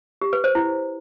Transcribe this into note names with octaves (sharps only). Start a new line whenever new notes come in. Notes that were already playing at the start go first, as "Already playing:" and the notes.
G4
B4
C5
E4